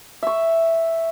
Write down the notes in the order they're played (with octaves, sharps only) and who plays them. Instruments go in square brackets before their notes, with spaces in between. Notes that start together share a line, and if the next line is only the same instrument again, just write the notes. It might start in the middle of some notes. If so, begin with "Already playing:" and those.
[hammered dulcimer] E5 C#6